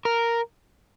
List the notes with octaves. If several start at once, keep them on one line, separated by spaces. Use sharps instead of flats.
A#4